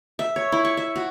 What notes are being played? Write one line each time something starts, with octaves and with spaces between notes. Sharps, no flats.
E5
C#5
E4
C#6
E5
F#4